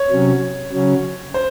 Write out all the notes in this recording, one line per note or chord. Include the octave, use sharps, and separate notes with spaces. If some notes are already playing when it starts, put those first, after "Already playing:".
Already playing: C#5
C3 F#3 C#4
C#3 F#3 C#4
C5